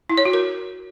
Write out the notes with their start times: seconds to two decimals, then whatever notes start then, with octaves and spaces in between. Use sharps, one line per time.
0.10 E4
0.17 C#5
0.25 F#4
0.33 A#4